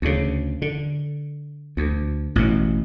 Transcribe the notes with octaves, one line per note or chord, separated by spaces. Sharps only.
D2 C#3
D3
D2
A1 B2